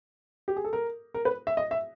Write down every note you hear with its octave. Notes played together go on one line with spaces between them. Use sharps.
G4
G#4
A4
A#4
A#4
B4
E5
D#5
E5